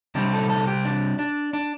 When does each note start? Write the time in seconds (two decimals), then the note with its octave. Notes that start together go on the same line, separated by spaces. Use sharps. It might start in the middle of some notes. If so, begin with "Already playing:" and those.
0.15 C2 C3 G3 C4 D4
0.33 A4
0.50 A4
0.67 G4
0.85 D4
1.19 D4
1.53 D4